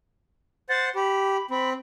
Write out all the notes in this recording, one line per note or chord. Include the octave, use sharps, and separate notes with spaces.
C5 F#5 A6
G4 B5
C4 B5